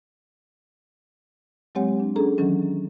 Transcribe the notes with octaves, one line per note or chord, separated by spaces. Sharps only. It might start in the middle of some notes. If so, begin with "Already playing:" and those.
F#3 G#3 C4 G4 C#5 F#5
D4
C#4 D4 G#4 A4 A#5
D#3 E3 F#3 C#4